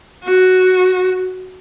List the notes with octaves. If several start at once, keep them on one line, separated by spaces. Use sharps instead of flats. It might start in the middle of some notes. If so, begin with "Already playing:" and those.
F#4